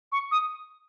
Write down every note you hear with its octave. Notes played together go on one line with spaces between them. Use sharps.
C#6
D#6